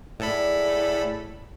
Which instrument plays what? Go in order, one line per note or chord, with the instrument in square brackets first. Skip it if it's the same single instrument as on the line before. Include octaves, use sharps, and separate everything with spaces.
[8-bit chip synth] A2 A4 B5 [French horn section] E4 G#4 D5